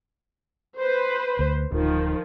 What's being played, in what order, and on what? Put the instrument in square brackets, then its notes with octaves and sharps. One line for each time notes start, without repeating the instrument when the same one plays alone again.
[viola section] B4 C5
[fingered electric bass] D2
[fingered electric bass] D1 [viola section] D#3 F3